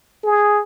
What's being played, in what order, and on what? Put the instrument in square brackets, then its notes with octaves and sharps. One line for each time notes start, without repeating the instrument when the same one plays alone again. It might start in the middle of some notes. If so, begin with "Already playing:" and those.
[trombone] G#4